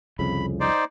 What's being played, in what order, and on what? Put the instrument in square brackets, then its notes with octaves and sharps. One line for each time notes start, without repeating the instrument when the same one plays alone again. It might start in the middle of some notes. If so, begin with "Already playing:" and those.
[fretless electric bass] C2 F2 C#3 [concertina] B5
[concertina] D#4 C5 D5